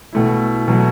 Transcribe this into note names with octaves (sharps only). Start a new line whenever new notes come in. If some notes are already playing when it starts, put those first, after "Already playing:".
B2 A3 E4
B2 F#3 A3